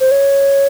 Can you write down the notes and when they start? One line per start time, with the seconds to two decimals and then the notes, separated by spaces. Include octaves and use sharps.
0.01 C5
0.11 C#5